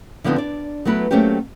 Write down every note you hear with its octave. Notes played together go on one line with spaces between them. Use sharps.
D3 F3 G3 B3 C4 D#4
D4 D5
F#3 A3 B3 E4 B4
F#3 A3 A#3 C4 C#4 G4